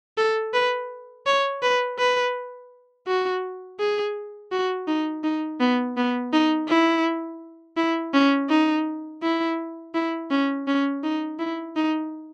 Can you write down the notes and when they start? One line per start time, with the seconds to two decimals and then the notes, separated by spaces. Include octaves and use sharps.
0.18 A4
0.54 B4
1.26 C#5
1.63 B4
1.99 B4
3.07 F#4
3.79 G#4
4.52 F#4
4.88 D#4
5.24 D#4
5.60 B3
5.97 B3
6.33 D#4
6.69 E4
7.77 E4
8.14 C#4
8.50 D#4
9.23 E4
9.94 E4
10.31 C#4
10.67 C#4
11.04 D#4
11.39 E4
11.76 D#4